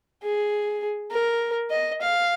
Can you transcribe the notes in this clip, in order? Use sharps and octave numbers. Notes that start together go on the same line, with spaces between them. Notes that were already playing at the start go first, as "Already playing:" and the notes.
G#4
A#4
D#5
F5